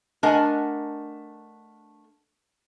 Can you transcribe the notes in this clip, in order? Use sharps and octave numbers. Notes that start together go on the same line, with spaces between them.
A3 D4 A#4 D#5 F#5 G#5